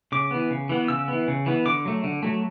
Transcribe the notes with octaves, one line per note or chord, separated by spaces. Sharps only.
C#3 D6
E3 B3
C#3
E3 B3
C#3 E6
E3 B3
C#3
E3 B3
D3 D6
F#3 A3
D3
F#3 A3